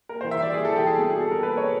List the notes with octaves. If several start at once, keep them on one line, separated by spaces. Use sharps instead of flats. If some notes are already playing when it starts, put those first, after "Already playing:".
A#3 A#4
C5
E3
E5
G3 D5
A#3 G#4
A4
E3
G4
G3 G#4
B2
G#4
B2
A4
G3 A#4
A#3 B4
B2 C#5